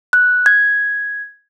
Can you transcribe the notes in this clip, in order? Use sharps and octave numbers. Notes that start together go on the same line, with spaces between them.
F#6
G#6